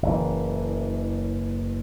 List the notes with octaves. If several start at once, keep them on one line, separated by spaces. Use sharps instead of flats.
F#1 E3